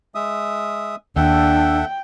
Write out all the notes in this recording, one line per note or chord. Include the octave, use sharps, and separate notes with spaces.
G#3 E5 D#6
D#2 D4 A4 E5 F#5 G5